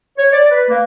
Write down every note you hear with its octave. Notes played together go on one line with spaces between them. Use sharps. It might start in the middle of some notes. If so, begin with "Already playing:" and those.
C#5
D5
B4
A#3